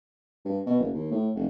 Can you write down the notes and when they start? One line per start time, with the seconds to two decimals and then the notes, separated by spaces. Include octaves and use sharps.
0.45 G2
0.66 B2
0.80 F#1
0.93 D#2
1.11 A2
1.36 F1